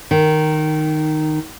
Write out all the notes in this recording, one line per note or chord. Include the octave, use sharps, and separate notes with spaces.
D#3